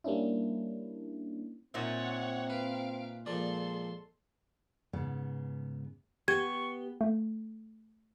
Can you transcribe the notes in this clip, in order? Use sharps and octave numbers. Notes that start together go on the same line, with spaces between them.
G3 A#3 C#4 D4 E4
A#2 C4 D#4 C#5 E5 F#5
B4 F5 D7
A#2 F3 G#3 A4 D5 C6
G#2 C#3 B3
B3 G4 C#6 G#6
A3